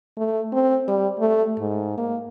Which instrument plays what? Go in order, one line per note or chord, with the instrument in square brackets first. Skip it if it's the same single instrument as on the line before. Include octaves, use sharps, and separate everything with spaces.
[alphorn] A3
C4
G3
A3
G#2
A#3